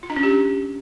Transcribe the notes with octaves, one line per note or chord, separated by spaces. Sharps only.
F4
D4
C#4
G4